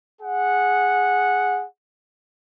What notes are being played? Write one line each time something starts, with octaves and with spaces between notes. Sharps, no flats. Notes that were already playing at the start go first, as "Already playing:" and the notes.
G#4 F#5